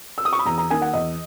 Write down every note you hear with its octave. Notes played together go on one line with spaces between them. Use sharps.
E6
D#6
C#6
B5
E2 A#5
A#5
D#3 A#3 G#5
F#5
E2 D#5